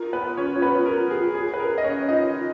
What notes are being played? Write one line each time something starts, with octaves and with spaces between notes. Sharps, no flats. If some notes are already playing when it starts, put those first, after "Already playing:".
Already playing: F4 A#4
B3 B4
C#4 C#5
C#5
B3 B4
A#4
G#4
G#4
B4
A#4
D#5
C#4 C#5
D#4 F4 D#5